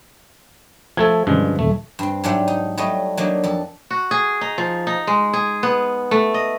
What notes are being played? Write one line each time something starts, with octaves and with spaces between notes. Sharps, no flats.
F3 A3 A4 G#6
G2 D3 F3 G#3 C#4
D#1 A3
G2 C4
G#2 F#3 D4 G4 E5 F#5
D#4
F#3 G3 A3 D#5
F#3 A#3 D4 D#4
F2 A4
F#4
G#4
D#4
F3
D#4
G#3
G#4
B3
A3
D#5